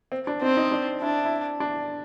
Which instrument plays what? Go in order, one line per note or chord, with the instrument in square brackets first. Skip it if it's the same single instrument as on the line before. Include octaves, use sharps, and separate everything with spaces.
[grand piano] C4
D4
[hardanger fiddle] C4 [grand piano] D#4
[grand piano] D#4
D4
[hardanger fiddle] D4 [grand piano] E4
[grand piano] E4
D4